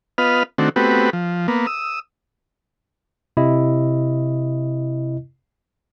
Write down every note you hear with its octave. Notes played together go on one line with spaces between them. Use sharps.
B3 F4 B4 D#5 F6
D#3 A3 C4 D4 F#4
A3 B3 C4 F#4 G4 B4
F3
A#3 B3
D#6 E6
C3 E4 D#5